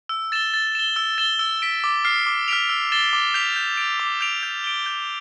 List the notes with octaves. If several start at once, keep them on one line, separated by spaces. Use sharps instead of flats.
E6
A6 E7 G7
A6
E7 G7
E6
A6 E7 G7
E6
B6 D7
D6
F6 C7
D6
F6 B6 D7 F7
E6
A6 E7 G7
D6
G6 B6 D7 F7
G6
D7 F7
D6
G6 D7 F7
G6
D7 G7
G6